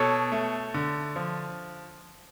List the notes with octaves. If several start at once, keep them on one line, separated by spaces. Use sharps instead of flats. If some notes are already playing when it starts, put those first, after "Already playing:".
Already playing: B2 A4 C#5
A3
D3
F3